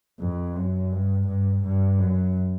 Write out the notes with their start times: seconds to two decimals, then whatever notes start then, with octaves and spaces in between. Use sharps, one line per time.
0.20 F2
0.56 F#2
0.92 G2
1.27 G2
1.64 G2
1.99 F#2